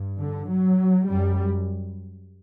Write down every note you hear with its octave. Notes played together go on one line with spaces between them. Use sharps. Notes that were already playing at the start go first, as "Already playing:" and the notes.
Already playing: G2
D3
F#3
F#2 G3